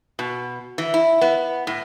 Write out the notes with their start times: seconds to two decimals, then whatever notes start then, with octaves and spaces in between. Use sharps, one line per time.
0.19 B2
0.78 E3
0.94 E4
1.21 B3
1.67 A2